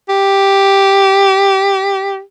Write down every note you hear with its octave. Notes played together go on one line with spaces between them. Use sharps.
G4